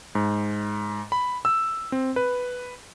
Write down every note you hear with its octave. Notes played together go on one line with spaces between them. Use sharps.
G#2
B5
E6
C4
B4